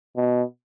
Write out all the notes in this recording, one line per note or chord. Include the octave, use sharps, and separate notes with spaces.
B2